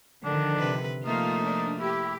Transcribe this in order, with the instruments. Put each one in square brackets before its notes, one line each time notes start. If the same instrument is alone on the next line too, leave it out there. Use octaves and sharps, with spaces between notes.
[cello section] D3 D#3 F3 [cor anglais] D4
[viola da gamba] C3 B4
[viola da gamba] F3 A3 A#3 [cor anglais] D#4 [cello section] F4
[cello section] D4
[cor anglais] E4 [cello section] G4